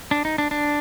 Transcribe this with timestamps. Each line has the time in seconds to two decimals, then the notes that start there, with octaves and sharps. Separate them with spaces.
0.11 D4
0.25 D#4
0.38 D4
0.51 D4